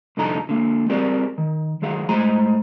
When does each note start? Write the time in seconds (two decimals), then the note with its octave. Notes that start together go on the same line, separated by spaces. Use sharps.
0.17 C2 F2 D3 D#4 A4 A#5
0.49 D3 A#3
0.89 G3 C4 G4 G#4 A#4 D5
1.38 D#3
1.82 D#3 F#3 G#4 F5 F#5
2.09 A2 G#3 C5 G#5 A#5 C6